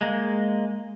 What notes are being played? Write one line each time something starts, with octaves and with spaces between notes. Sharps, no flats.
G#3 A#3